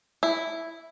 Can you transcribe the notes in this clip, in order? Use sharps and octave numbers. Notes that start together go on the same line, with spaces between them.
E4